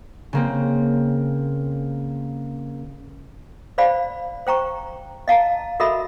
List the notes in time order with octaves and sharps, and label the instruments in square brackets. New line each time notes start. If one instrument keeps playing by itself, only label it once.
[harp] C#3 A#3 C4
[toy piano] C5 D5 F5 B5
C5 G5 A#5 C#6
D#5 F5 A5 A#5
F#4 A4 A#4 D#5 E5 B5